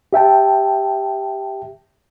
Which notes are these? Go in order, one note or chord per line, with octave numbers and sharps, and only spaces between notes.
G4 E5 G5 A5